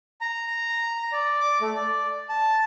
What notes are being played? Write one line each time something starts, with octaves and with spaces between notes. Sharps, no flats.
A#5
D5
D6
A3
D5
A5